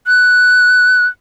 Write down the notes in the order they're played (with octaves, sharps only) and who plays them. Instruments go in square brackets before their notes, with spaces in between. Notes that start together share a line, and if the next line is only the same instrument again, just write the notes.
[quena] F#6